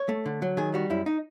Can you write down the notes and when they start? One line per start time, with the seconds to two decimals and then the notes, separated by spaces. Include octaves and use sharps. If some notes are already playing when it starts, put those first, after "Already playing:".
Already playing: C#5
0.09 A3
0.26 D3
0.42 F#3
0.57 D#3 G#4
0.74 G3 F#4
0.90 F#2 E4
1.06 D#4